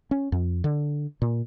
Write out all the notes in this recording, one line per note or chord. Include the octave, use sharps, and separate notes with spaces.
C#4
F2
D3
A#2